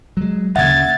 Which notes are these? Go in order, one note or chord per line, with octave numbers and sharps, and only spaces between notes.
F#3 G#3
D2 C#3 A#3 E5 F#5 G#6 A6